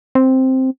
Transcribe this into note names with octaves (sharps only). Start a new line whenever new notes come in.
C4